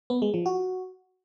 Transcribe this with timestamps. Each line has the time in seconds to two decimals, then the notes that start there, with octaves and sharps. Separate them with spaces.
0.10 B3
0.22 G#3
0.34 F3
0.46 F#4